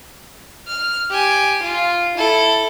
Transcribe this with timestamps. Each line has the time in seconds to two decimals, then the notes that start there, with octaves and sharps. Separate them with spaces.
0.68 F6
1.10 G4 G#5
1.63 F4
2.18 E4 A4